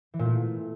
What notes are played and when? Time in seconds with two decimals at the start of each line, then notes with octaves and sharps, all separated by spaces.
0.14 E3
0.19 A#2
0.25 A3